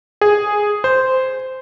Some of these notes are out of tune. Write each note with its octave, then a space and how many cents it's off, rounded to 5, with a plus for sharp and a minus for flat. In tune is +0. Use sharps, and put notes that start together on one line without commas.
G#4 -5
C5 -10